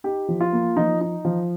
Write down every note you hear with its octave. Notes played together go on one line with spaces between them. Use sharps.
D#4 G4
F3
F4
A#3
F3 D#4
D#4
F3